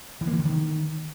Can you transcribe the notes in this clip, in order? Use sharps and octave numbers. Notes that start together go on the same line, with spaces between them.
E3
A#3
E3
D3
D#3